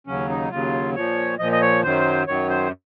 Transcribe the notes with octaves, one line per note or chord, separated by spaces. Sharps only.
D#2 C#3 F#3 C#4
D#4
D#2 C#3 F#3 F4
A#2 F3 C#5
A#2 F3 D#5
D#5
C#5
F#2 D#3 F#3 C5
F#2 D#3 F#3 C#5
C5